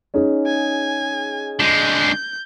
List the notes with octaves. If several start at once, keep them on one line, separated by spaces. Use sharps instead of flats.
C#4 D#4 G#4
G#5
D3 G#3 G6